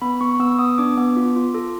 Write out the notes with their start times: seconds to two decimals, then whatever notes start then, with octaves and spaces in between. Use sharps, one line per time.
0.02 B3 B5
0.21 B3 C#6
0.40 B3 E6
0.58 B3 D#6
0.78 D4 D6
0.98 B3
1.17 F4
1.36 F4
1.54 A4